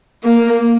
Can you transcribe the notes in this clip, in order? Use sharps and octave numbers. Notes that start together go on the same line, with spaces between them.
A#3